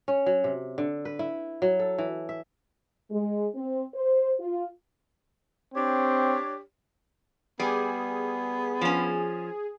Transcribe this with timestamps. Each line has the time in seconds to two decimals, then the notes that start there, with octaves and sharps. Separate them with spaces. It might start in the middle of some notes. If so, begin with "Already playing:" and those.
0.08 C#4
0.26 F#3
0.44 C3
0.78 D3
1.05 B4
1.19 E4
1.62 F#3
1.79 A4
1.98 E3
2.29 E5
3.11 G#3
3.55 C4
3.93 C5
4.39 F4
5.74 C4 D4 G4 C#5
7.60 G3 B3 G#4
8.81 F3 C#4